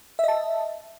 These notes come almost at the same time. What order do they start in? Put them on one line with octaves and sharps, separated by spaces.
E5 D#5 A5